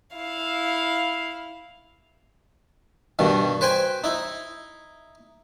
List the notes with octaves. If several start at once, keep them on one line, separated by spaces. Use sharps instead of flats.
E4 F5
G2 B2 D#3
B4 C5 G5 G#5 B5
D#4 E4